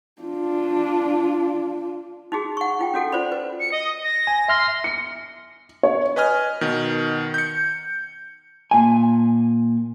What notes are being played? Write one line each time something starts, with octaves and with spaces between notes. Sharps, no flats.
D4 F4
D#4 F#4 G#4
F#5 C#6
D#4 F4 G5
C#4 F#4 A4 F#5
F4 C5 D5 B5
B4
C#7
D#5
A#6
G#5
E5 C6 F6 A#6
C#7
C#5
B4 D#5 G#5 F6
B2 D#3
G6 C#7
A#2 G#5